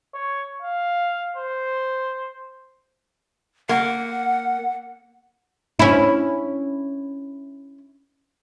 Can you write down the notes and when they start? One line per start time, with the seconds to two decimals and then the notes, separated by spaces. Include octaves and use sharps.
0.14 C#5
0.62 F5
1.36 C5
3.69 A#3 F#5
5.79 C#4 E4